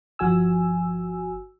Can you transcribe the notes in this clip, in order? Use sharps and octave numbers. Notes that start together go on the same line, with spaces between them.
G1 F3 F#4 G#5 E6